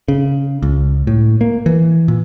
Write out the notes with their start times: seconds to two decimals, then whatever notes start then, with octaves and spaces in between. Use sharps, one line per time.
0.08 C#3
0.62 C#2
1.07 A2
1.41 A#3
1.66 E3
2.08 A#2